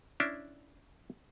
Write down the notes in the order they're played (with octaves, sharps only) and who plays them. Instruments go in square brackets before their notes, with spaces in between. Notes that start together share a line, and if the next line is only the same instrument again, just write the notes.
[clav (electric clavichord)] C#4 D4 E4